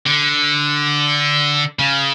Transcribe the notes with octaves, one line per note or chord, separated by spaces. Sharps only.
D3
C#3